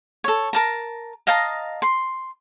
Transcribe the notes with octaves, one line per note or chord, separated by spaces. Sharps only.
A4 C#5
A#4 A5 A#5
D#5 F5 A5 A#5
C6